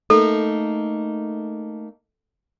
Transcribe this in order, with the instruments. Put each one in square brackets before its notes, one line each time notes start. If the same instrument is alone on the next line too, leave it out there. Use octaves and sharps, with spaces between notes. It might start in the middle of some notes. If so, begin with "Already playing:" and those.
[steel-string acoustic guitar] A3 A#3 D#4 [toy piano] A4